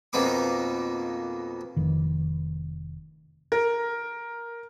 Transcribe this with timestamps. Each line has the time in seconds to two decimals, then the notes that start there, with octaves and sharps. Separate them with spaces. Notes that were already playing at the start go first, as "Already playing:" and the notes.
0.13 F2 B2 A#3 D#4 B5 D6
1.76 F1 D#3
3.52 A#4